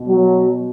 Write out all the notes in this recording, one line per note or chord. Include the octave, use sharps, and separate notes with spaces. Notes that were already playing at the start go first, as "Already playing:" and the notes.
Already playing: B2
F#3